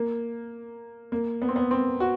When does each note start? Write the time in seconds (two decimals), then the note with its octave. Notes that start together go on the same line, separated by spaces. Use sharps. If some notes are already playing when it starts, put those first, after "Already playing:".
Already playing: A#3
1.12 A#3
1.42 B3
1.48 C4
1.56 B3
1.71 C4
2.00 F#4